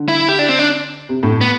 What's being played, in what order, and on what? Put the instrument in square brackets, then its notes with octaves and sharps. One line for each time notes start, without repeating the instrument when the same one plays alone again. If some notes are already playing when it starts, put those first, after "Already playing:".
Already playing: [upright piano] D3
[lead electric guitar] E4
G4
D4
C4
D4
[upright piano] C3
A2
[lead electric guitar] B3